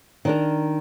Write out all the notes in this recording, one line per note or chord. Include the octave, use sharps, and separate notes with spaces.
D#3 D4 A#4